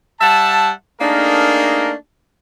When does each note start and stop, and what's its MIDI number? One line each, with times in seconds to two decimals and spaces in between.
0.21 0.71 55
0.21 0.71 76
0.21 0.71 78
0.21 0.71 81
1.00 1.92 57
1.00 1.92 58
1.00 1.92 62
1.00 1.92 63
1.00 1.92 68
1.00 1.92 70